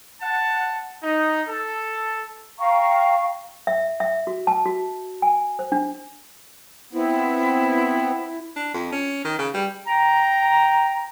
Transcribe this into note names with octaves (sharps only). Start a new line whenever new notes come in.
F#5 A5
D#4
A4
F5 G5 A#5 C#6
E5
E5
F#4
A5
F#4
G#5
C5
D4
B3 C4 E4
D4
F2
C#4
D#3
C#3
G3
G5 A#5